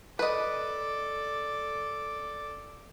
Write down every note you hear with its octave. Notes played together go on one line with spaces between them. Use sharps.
A4 B4 D5 D#5